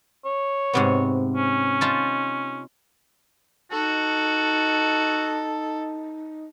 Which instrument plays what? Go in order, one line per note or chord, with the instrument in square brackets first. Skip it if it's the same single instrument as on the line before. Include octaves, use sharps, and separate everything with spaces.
[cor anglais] C#5
[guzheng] G#2 C3 B3
[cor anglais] C#4
[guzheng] D#4 F4 A5
[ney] D#4 [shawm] F#4 [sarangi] A4